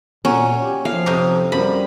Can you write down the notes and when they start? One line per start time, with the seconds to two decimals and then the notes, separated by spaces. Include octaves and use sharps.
0.25 A#2 F#3 C#4
0.62 G4
0.85 F3 F5
1.06 F2 C3 D#4
1.52 F#2 G3 B5